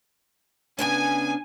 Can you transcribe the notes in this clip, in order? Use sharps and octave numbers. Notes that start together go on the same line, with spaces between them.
C#3 B3 D4 G#5